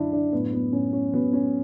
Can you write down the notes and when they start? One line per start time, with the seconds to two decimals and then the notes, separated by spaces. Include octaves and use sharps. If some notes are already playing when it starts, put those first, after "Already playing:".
Already playing: F#2 D3 F#3 D4 E4
0.12 D4
0.32 A2 B3
0.53 B3
0.72 A2 C#4
0.93 C#4
1.13 F#3 B3
1.33 C#4